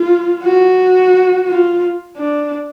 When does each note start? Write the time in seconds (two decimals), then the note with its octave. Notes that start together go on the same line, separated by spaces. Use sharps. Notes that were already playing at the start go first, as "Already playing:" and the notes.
Already playing: F4
0.44 F#4
1.48 F4
2.17 D4